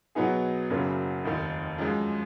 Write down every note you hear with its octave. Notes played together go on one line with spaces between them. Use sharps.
B2 F#3 B3 D#4 G#4
F#1 F#2 C#3 F#3 A#3
F1 D#2 D#3
F#2 F3 G#3